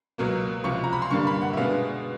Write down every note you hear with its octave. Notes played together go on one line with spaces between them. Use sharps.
C#2 B2 F#3 A#3
C#2 C3 F3 C#6
A#5
B5
C6
G2 D3 G3 A#3 D4 C#6
B5
F#5
E5
B2 G#3 B3 D4 F5